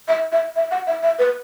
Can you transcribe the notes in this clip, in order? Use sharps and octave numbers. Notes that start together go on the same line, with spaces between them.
E5
E5
E5
F#5
E5
E5
B4